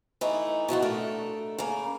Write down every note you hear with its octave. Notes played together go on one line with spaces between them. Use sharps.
E3 A3 D#4 E4
B2 E3 F3 F#4
A3 D4 A4 A#4
C#3 A#3